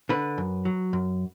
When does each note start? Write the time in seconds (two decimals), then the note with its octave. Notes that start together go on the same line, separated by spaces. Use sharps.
0.09 D3 B4
0.38 F#2
0.65 F#3
0.93 F#2